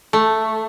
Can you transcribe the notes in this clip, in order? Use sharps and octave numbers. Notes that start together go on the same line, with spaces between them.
A3